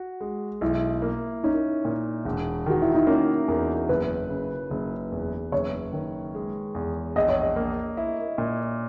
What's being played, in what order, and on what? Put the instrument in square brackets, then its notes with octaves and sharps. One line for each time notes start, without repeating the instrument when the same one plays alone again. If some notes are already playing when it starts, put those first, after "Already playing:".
Already playing: [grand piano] F#4
G#3
[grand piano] B1 [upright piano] E4
[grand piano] A#3
[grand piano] C#4 [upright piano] D#4
[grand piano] A#2
E1
[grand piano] D#3 [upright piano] F#4
[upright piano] E4
D#4
[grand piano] A#3 [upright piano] C#4
[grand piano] E2 [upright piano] A#4
[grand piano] F#1 [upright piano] B4
[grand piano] C#3
F#1
E2
[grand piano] F#1 [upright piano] C#5
[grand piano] D#3
G#3
E2
[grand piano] A#1 [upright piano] D#5
[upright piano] C#5
D#5
[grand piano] A#3
E4
A#2